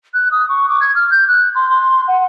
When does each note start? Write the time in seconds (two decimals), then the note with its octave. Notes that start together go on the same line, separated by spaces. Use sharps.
0.14 F#6
0.31 D#6
0.48 C#6
0.68 D6
0.81 G#6
0.95 F6
1.11 G6
1.27 F#6
1.55 C6
1.70 C6
2.08 F#5